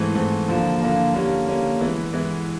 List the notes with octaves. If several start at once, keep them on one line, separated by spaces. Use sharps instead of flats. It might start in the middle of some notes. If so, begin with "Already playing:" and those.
Already playing: G#2 E3 A3 C4
G#2 E3 A3 C4
D3 F3 A#3
D3 F3 A#3
D3 G3 A#3 C#4
D3 G3 A#3 C#4
E3 G#3 B3 E4
E3 G#3 B3 E4